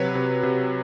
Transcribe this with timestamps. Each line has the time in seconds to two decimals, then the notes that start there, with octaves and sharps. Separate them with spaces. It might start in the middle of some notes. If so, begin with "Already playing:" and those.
Already playing: C3 F#3 B4 C#5
0.15 C3
0.43 C3